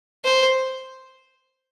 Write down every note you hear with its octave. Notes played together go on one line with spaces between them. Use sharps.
C5